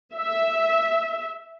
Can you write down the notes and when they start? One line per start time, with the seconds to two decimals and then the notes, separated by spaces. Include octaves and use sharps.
0.16 E5